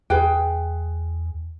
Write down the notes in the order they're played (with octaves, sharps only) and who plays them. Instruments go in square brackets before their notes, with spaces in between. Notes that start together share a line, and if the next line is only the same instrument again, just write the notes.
[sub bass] E2 [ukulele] G#4 B4 G5